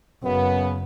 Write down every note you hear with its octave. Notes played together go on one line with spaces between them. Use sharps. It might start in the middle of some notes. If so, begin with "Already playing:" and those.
F#1 F#2 C#3 B3